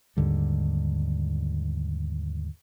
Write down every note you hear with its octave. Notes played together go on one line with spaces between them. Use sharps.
D#2 G#2 D3 G3